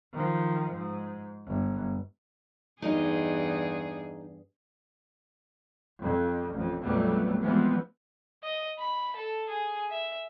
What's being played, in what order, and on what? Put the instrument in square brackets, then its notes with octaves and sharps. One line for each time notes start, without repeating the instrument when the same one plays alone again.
[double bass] D#3 F3
G#2
G1
[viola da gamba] E2 G2 G#4 [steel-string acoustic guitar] D#4 D#5 F5
[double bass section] F2
A1 F2
A#1 F2 F#3 G3 A3 B3
E3 F3 G3 G#3 B3 C4
[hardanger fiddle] D#5
B5
A4
G#4
E5